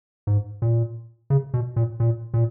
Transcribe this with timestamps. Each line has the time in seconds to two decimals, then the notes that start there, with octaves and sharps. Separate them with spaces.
0.27 G#2
0.62 A#2
1.30 C#3
1.54 B2
1.76 A#2
2.00 A#2
2.34 A#2